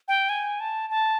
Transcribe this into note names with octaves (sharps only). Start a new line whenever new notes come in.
G5
G#5
A5
A5